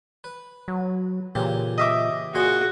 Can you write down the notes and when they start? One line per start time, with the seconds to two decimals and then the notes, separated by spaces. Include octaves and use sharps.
0.24 B4
0.68 F#3
1.35 A#2 C#3 E3 G4
1.78 D#5 E5 D6
2.35 A#2 F#4 G#4 F5 C6